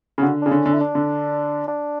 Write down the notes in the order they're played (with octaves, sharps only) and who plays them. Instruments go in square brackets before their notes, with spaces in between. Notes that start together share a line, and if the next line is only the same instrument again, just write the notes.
[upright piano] C#3
[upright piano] D3 [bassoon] F#4
[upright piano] C#3 [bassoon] D4
[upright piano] D3 [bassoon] C#4
[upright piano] D3
[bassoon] E4
D4
[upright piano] D3
[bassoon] D4